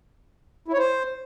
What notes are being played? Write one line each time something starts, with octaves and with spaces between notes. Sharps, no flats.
E4
C#5
C5